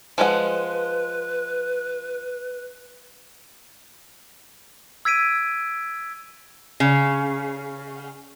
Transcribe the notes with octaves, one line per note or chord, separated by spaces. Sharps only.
F3 G#3 B4 F#5
E6 G#6 B6 D7 D#7
C#3